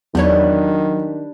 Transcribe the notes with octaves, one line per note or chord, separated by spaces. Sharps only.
E2 D#3 F#3 G3 D4 B4 C#5